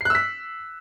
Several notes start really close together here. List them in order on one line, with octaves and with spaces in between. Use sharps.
C7 F#6 E6 B6